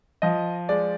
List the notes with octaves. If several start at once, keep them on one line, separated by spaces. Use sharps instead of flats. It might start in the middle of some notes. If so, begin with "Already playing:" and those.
F3 D#5
G#3 D5